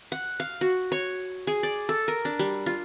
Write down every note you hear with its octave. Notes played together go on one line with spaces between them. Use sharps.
F#5
F5
F#4
C#5
G#4
D5
A4
A#4
D4
G3
F4